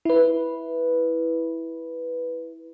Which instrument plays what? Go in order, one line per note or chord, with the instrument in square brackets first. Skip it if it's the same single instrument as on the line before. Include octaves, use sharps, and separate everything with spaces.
[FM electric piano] E4 B4